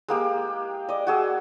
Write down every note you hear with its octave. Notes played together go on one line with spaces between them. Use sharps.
G#3 A#3 G4
D5 D#5
F#4 G#4 E6